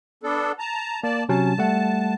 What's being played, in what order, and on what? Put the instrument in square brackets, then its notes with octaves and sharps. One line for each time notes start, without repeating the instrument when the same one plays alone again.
[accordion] B3 D4 A4
A5 A#5
[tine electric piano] A#3 [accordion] D5 A5
[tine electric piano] C3 F#3 C#4 [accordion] A5
[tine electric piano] G3 A3 F#5